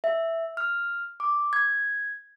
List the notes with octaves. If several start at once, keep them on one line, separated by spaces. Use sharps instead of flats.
E5
F6
D6
G#6